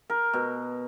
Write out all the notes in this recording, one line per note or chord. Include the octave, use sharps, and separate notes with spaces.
A#4
B2